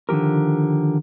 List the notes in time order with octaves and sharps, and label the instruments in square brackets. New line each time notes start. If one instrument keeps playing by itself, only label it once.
[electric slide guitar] D3 D#3 F3 G4 A#4